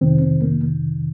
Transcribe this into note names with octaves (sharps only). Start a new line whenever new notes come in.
F2 C3 D#3 C4
C4
A#3